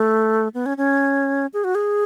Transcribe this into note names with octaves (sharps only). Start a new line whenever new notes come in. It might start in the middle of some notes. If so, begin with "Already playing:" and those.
Already playing: A3
B3
C#4
C#4
G#4
F#4
G#4